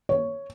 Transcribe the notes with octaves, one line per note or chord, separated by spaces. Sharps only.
C#5